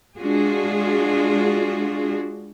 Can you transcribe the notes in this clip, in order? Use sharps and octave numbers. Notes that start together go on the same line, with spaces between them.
G#3 D4 F4 F#4 G#4